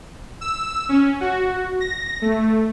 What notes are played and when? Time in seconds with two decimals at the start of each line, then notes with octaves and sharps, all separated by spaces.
0.41 E6
0.89 C#4
1.21 F#4
1.80 A#6
2.22 A3